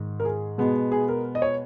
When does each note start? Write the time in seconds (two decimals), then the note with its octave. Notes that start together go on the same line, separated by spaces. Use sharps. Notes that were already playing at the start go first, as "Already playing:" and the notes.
Already playing: G#2 D#3
0.20 A#4
0.25 G#4
0.58 B2 G#3 B3
0.92 G#4
1.09 A#4
1.35 D#5
1.42 C#5